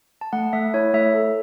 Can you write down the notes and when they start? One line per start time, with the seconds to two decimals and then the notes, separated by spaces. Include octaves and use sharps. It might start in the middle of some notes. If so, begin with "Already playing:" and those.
0.21 A5
0.33 A3 F#5
0.53 A3 E5
0.74 E4 C#5
0.94 A3 E5
1.14 A4